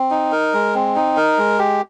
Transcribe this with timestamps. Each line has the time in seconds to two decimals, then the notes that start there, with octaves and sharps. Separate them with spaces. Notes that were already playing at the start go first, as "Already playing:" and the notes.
Already playing: C4
0.11 D#4
0.32 A#4
0.54 G#3
0.74 C4
0.96 D#4
1.17 A#4
1.38 G#3
1.59 G4